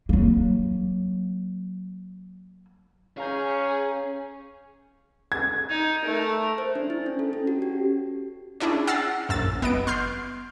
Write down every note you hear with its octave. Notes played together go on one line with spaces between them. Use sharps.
F#3 A#3
C#4 G#4 F5 A#5 G6
G#6
D#4
A3 A#4
C5
D4
E4
C#4
A4
C#4
F#4
G4
C#4 D4 E4 G#4
F#5 E6 F6 A6 A#6 C7
A#1 F#2 E6 A6
G1 B3 D#5 D7
C6 F6 G6 C7